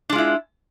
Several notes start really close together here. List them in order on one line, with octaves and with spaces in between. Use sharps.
D4 G#3 F4 E4